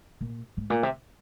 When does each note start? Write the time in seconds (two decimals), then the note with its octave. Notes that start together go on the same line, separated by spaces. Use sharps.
0.21 A#2
0.57 G#2
0.70 A#2
0.83 C3